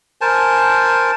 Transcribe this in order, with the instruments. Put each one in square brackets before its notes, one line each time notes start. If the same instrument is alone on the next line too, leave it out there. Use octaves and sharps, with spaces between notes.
[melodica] A#4 C5 G#5 A5